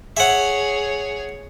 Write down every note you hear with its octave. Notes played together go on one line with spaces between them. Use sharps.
G#4 C#5 E5 F#5